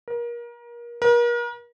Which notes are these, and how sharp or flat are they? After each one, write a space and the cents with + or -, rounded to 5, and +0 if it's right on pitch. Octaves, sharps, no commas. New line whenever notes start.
A#4 +30
A#4 +40